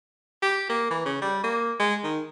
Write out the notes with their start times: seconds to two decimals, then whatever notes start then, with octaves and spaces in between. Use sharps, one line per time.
0.43 G4
0.69 A#3
0.91 E3
1.05 C#3
1.22 G3
1.44 A#3
1.80 G#3
2.04 D#3